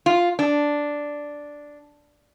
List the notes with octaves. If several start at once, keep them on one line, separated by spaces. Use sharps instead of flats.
F4
D4